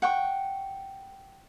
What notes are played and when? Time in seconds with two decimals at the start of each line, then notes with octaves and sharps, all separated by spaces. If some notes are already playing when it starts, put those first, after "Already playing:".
0.02 F#5 G5 C#6